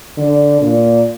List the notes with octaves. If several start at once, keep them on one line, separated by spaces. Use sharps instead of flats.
D3
A#2